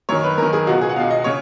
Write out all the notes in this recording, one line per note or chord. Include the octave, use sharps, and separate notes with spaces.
F#2 D#3 C#5
B4
F#2 D#3 A#4
G#4
C#2 B2 F#4
G#4
F#5
C#2 B2 F5
D#5
C#3 C#5